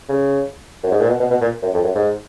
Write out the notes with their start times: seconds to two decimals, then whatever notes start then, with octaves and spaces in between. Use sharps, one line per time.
0.09 C#3
0.83 F#2
0.92 G#2
1.00 A#2
1.09 B2
1.20 B2
1.30 B2
1.41 A#2
1.62 F#2
1.73 F2
1.83 F#2
1.95 G#2